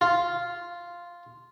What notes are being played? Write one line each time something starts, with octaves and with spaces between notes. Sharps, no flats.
F4